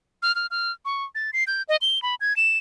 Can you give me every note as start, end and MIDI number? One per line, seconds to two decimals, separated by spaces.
0.22 0.34 89
0.35 0.47 89
0.51 0.72 89
0.85 1.04 85
1.15 1.31 93
1.33 1.44 96
1.47 1.62 91
1.69 1.76 75
1.82 2.02 103
2.02 2.15 83
2.21 2.36 92
2.37 2.58 100